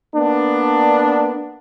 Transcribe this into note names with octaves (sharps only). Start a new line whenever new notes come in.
A#3 B3 D4